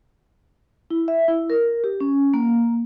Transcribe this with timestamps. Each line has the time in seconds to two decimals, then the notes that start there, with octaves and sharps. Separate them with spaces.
0.90 E4
1.08 E5
1.28 E4
1.50 A#4
1.84 G4
2.00 C#4
2.34 A#3